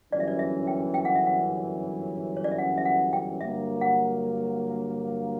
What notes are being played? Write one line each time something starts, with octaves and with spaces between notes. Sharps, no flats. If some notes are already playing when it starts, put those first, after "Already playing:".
G1 F#2 E3 G3 C#4 D5
E5
D5
E5
G5
G5
F#5
E5
F#5
C#5
D5
E5
F#5
E5
F#5
G5
G2 D3 F#3 A#3 E5
F#5